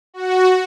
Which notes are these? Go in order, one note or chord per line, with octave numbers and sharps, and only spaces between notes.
F#4